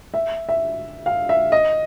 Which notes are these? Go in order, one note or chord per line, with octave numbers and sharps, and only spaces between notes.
E5
E5
F5
E5
D#5